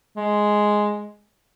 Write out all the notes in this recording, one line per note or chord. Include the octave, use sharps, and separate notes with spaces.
G#3